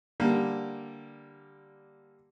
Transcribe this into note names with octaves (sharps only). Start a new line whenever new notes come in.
D3 G3 A#3